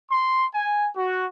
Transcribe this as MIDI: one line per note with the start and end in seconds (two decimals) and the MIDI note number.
0.10 0.47 84
0.53 0.88 80
0.96 1.25 66